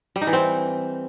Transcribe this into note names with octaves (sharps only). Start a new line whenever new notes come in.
G3
D#4
E3
C4